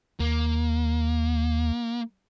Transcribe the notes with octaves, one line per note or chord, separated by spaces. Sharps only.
D#2 A#3